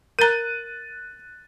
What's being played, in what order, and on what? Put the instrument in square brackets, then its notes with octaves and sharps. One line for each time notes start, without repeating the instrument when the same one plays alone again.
[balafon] A#4 A#5 [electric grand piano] F#6 A6 D#7